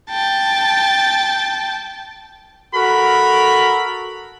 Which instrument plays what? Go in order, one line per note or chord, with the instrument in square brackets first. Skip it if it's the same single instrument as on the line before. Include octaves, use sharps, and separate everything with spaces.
[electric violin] G5 A5
[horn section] F#4 A4 A#4 B5